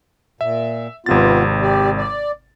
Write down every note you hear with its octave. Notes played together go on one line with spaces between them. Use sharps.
A#2 E5
G#1 C3 B3 F4 A6
G4 D5
D5